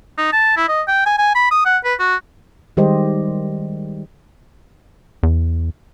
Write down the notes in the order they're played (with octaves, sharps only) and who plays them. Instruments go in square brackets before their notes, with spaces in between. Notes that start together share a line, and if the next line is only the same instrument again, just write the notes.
[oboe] D#4
A5
E4
D#5
G5
G#5
G#5
B5
D#6
F#5
B4
F#4
[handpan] D#3 G3 G#3 G4 C5 D#5
[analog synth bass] E2